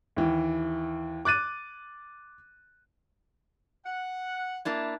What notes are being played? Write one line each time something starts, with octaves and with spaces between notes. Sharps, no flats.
D#2 E3
D6 F#6 A6 D#7
F#5
A#3 D4 E4